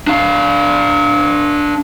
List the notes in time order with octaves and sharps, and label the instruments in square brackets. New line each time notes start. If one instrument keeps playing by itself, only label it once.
[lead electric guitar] D4 F5